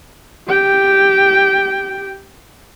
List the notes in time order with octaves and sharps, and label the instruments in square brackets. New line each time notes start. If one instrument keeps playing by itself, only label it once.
[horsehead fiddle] G4 G5